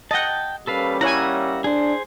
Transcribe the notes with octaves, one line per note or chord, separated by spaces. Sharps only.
D#5 F#5 G5 A5
G3 A#3 C#4 A4 B4 F5
E4 C#5 E5 F#5 G#5 A#5
D4 G#4 C5